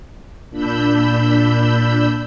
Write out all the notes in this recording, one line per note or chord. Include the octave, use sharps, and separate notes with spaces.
A#2 D4 B5 E6 G6